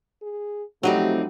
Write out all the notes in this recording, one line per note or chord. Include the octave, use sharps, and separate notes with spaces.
G#4
F2 F#3 G3 A3 C4 D#4 G4 D5